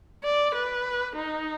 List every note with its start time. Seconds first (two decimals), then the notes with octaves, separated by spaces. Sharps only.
0.24 D5
0.55 B4
1.16 D#4